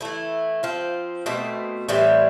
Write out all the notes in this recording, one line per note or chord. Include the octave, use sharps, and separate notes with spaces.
E3 A3 E4
F3 C4 F4
B2 A3 C4
A2 E3 G3 C4